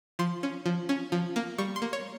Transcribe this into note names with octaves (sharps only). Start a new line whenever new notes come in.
F3 C6
C#4
F3
C#4
F3
A#3
G3 C#6
C6
A#3
C#5